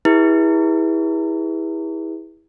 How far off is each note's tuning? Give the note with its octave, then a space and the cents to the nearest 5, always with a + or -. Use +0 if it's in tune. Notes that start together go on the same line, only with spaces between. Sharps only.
E4 -20 G#4 -45 B4 -45